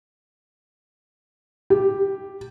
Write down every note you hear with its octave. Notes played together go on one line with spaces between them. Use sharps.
G4